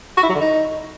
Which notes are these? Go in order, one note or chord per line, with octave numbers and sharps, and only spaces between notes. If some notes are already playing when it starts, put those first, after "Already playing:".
F#4
E4
F#3
D3
D#4